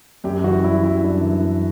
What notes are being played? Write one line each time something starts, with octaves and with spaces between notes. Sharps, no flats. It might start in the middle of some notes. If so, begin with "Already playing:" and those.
F#2 G4
E3 F#4
G3 E4
G3 E4
F#2 D4
E3
F#2